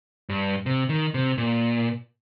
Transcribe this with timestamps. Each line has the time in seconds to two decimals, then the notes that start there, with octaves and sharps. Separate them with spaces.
0.29 G2
0.66 C3
0.89 D#3
1.14 C3
1.38 A#2